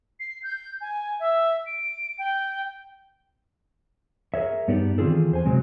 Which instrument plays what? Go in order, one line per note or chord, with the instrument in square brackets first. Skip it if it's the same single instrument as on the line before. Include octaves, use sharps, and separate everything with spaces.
[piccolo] C7
G6
G#5
E5
D7
G5
[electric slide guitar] G#4 A#4 C#5 E5
G2 B3 D#4 G4 D5
D#3 E3 C4 F4 G#4 A4
E2 C5 G#5
C3 F#3 G#3 C4